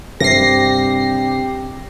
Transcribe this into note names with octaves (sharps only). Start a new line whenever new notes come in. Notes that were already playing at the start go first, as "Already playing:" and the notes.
G2 C3 G4 A#6 C7